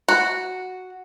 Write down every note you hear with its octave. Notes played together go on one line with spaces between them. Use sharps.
F#4